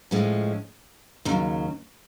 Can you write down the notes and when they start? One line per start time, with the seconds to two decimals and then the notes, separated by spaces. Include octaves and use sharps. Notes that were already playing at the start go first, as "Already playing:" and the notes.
0.11 A2 F3 G#3 C#4
1.25 D#2 C#3 F#3